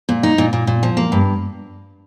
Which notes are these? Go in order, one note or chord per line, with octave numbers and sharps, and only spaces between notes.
A#2
D#4
A#2
A#2
A#2
F3
A#3
G2